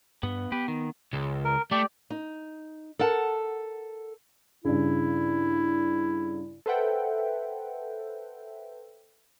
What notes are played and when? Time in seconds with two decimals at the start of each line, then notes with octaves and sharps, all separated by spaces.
0.23 G2 B3
0.52 B3 G4 B4
0.68 D#3
1.13 C#2
1.45 A#4
1.71 A3 G4 D5
2.10 D#4
2.99 A4 A#4 F#5 A5
4.65 G2 C#3 E4
6.66 A4 B4 C5 E5 F#5 G5